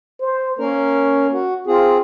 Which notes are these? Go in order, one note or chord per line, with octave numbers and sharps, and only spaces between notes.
C5
A#3 C#4 A#4
F#4
C4 F4 G#4